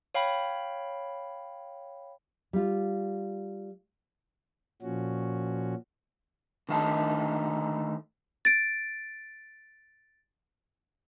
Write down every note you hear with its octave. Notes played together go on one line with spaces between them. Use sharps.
C#5 F5 G5 B5
G3 F4
A#2 F3 C#4 F#4
D3 D#3 A3 D#4 E5 A5
A6 D7